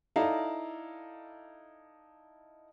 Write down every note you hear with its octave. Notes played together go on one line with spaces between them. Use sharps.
D#4 E4 A4 D5 F5 A#5